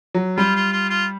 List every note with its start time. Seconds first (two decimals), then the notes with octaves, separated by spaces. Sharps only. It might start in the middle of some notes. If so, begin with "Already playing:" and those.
0.14 F#3
0.37 G3 F4
0.55 F4
0.72 F4
0.89 F4